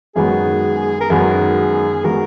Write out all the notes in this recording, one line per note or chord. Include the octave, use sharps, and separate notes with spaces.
F#2 D#3 G#3 B3 F#4 G#4
A#4
F#2 D#3 G#3 B3 F#4 G#4
D#3 G#3 B3 F#4 A#4